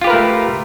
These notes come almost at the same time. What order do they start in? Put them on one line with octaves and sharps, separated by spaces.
F4 G4 B4 A#4 A3